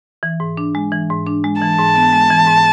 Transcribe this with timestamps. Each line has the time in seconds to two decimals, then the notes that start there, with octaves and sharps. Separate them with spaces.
0.23 E3
0.40 G#2
0.57 D4
0.75 G#3
0.92 E3
1.10 G#2
1.26 D4
1.44 G#3
1.61 E3 A5
1.79 G#2
1.96 B3
2.12 G#3
2.30 E3
2.47 G#2